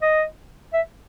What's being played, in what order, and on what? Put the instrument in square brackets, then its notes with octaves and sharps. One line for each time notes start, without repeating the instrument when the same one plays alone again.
[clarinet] D#5
E5